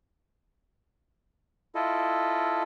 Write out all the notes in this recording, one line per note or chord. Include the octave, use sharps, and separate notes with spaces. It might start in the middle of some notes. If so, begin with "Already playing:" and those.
E4 F4 A4 D#5